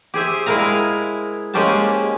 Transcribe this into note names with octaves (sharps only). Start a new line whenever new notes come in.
G4 G#4 C5 E5
G#3 E4 G#4 A#4 F5 A#5
G#3 A#3 C#4 G4 C5 A5